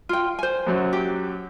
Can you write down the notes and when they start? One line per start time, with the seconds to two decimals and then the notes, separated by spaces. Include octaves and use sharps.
0.09 F4 G5
0.39 C5 G#5
0.67 F#2 F#3
0.93 G4